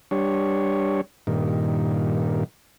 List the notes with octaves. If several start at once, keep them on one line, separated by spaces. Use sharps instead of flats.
G3 D4 C#5
G2 A#2 D#3